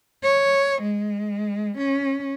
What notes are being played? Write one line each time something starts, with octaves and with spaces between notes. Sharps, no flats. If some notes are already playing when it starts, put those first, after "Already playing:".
C#5
G#3
C#4